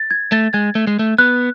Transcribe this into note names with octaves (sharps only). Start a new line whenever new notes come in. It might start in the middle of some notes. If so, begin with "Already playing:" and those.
Already playing: A6
G#6
A3 A6
G#3 G#6
A3
G#3
A3
B3 F#6